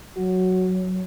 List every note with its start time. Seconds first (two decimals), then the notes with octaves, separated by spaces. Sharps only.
0.16 F#3 F#4